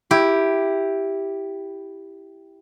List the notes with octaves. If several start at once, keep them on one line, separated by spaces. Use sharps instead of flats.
E4 G4